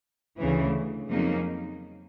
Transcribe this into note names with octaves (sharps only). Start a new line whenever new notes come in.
D2 C#3 E3
F2 C#3 F#3 A#3 D#4